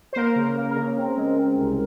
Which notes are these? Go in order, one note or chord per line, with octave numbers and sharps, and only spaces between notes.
C5
A#3 A#4
C#3
A#3
A#4
C#3
C4
G#3
C4
C2